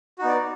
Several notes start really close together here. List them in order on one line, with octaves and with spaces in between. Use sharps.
F#4 D#4 B3 D5